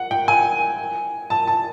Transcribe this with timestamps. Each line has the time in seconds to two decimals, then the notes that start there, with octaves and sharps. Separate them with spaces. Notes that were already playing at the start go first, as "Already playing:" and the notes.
Already playing: F#5
0.11 G5
0.28 G#5
1.30 A5
1.47 A5